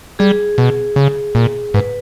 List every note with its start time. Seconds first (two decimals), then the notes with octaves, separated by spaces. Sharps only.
0.19 G3 G#4
0.58 B2
0.96 C#3
1.35 A#2
1.74 G#2 B4